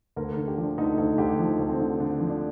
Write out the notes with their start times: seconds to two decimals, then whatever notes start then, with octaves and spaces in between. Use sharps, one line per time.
0.16 D2 A#4
0.33 D3 A#4
0.48 G4
0.58 F3
0.63 D4
0.78 D2 D#4
0.98 D2 D#4
1.18 D2 G4
1.39 F3 D#4
1.59 D2
1.69 C4
1.79 D3
2.00 D3 D4
2.20 F3
2.30 D4